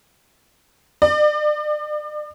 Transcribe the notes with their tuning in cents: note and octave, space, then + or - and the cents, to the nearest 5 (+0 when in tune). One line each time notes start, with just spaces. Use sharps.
D5 +35